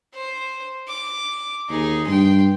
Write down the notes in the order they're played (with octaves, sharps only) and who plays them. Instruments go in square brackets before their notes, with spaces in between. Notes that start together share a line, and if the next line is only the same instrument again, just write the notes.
[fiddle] C5
D6
[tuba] D#2 [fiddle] D#4 G#4
[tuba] G2 [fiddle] G5 C6